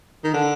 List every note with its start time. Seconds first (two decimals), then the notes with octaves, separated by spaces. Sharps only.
0.24 D#3
0.34 D3